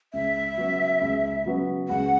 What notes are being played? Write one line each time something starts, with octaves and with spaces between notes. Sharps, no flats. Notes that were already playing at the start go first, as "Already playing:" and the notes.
C#2 E5
C#3 F#3 B3 F#4
C#2
C#3 F#3 B3 F#4
C#2 F#5